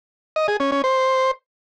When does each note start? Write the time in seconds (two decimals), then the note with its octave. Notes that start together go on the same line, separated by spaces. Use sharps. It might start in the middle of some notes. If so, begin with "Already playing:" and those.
0.36 D#5
0.48 G#4
0.60 C#4
0.72 C#4
0.84 C5